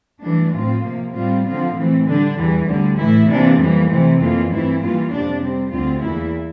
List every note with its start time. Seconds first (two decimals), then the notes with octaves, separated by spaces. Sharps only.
0.22 G2 E3 A3 D4
0.53 A2 F3 C4 F4
0.83 C3 F3 A#3
1.14 A2 G3 C4 F4
1.44 D3 F3 C4 F4
1.75 A2 E3 A3 C4
2.06 D3 G3 D4
2.36 E2 E3 G3
2.66 D2 D3 G3
2.98 A2 E3 A3 E4
3.27 C3 E3 A#3 D4
3.58 F2 E3 G3 A#3
3.89 C3 E3 A3 C4
4.20 F2 E3 A#3 F4
4.50 G2 E3 A3 C4 E4
4.81 G2 E3 G3 A#3 F4
5.12 F2 C3 G3 D4
5.42 C3 G3 C4
5.72 D2 D3 G3 C4 F4
6.03 E2 E3 A#3 E4